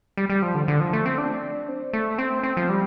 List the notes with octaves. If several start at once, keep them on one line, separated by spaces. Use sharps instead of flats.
G3
G3
F3
D3
D3
F3
A3
C4
D4
C4
A3
C4
C4
F3
G3